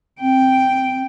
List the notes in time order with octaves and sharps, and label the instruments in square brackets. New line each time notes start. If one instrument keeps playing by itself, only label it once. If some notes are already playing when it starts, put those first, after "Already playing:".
[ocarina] C4 [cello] G5